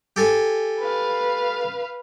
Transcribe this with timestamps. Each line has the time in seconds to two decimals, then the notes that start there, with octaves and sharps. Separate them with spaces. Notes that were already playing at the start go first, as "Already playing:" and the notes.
0.16 G4 A4 G#5
0.79 B4 F5